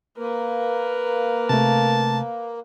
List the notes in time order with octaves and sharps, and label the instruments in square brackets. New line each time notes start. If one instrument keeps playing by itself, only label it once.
[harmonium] A#3 [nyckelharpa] A#4 B4
[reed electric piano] C3 A3 [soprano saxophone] A5